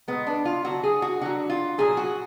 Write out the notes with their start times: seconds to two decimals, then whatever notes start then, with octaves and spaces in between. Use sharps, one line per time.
0.08 A#2 G#3 B3
0.27 D4
0.45 F4
0.64 D3 F#3 F#4
0.83 G#4
1.02 F#4
1.21 D3 F#3 F#4
1.50 F4
1.78 A#2 F#3 G#4
1.97 F#4